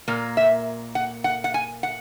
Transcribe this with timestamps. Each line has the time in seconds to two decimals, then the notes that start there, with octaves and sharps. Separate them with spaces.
0.08 A#2 A#3
0.37 E5
0.95 F#5
1.24 F#5
1.44 F#5
1.54 G#5
1.83 F#5